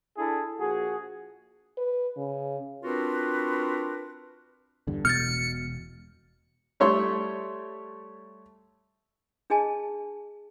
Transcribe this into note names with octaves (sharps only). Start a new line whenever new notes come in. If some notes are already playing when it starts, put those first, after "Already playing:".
D4 E4 G#4 A4
A#1 F#4 G#4
B4
C#3
C4 D4 F4 F#4 A#4 B4
E2 G2 D3
E1 B2 F6 G6 A6 C#7
G3 A3 C#5 E5 C6
D4 G#4 D#5 G#5 A5